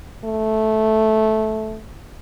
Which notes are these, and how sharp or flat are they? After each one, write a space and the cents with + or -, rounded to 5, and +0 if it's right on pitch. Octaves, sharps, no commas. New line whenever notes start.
A3 -10